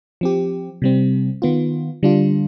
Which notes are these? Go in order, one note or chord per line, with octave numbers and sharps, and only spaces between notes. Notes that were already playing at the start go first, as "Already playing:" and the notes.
F3 C4 G4
C3 G3 C4
D#3 B3 F4
D3 G3 D4 F4